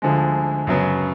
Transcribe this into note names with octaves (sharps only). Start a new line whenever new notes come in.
D2 D3 F3 G#3
F#2 C#3 F#3 B3